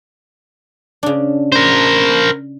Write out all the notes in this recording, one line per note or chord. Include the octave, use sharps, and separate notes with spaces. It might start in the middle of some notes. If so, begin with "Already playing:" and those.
C#3 D4
A#4 C5